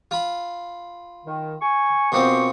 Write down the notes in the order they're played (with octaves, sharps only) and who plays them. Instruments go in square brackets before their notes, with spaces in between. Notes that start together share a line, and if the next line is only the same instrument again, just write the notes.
[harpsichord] F4 B5
[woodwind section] D#3
G#5 C#6
[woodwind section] F#2 G4 C#6 [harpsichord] B2 F3 C4